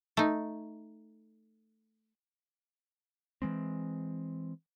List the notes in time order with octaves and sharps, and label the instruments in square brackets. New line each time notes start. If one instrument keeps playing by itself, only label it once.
[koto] A3 D#4
[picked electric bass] E3 G#3 C4